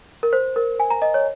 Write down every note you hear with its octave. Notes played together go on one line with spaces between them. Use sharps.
A#4
C5
A#4
G#5
A#5
D#5
C#5